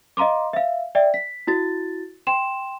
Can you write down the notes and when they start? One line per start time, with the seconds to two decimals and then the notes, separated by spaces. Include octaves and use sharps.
0.17 D#5 F5 A#5 C6 D6
0.53 E5 F5
0.95 D5 E5 G5
1.14 B6
1.47 E4 F#4 A6
2.27 G5 C6 E7